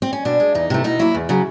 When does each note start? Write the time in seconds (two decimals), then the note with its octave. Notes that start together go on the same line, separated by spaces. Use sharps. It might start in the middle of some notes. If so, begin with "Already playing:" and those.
0.02 C4
0.13 C#4
0.25 B2 D4
0.40 G#3
0.55 E2 D#4
0.70 C3 E3 A3
0.84 B2 D#4
0.99 F#3 A#3 E4
1.15 E2
1.29 C#3 F#3